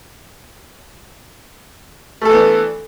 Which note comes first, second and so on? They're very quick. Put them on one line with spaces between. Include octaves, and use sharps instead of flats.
A3 A4 E3 B3 D4